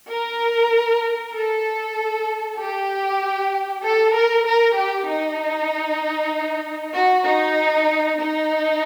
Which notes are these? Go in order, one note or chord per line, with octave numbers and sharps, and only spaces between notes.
A#4
A4
G4
A4
A#4
A#4
G4
D#4
F#4
D#4
D#4